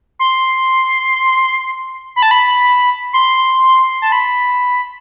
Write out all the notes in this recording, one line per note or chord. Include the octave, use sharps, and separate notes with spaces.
C6
B5
A5
B5
C6
A5
B5